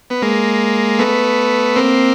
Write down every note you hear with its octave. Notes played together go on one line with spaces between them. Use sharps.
B3
G#3 A#3
A3 B3
A#3 C4